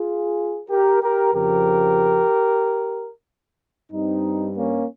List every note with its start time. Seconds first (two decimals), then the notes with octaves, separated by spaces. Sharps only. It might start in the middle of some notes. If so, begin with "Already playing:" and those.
Already playing: F4 G#4
0.70 G4 A#4
1.02 G4 A#4
1.34 F2 C#3 F3 G4 A#4
3.92 G2 G3 C4 D#4
4.56 A#3 C#4